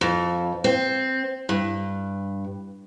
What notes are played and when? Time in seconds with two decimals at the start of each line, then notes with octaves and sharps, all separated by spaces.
0.01 F2
0.64 C4
1.49 G2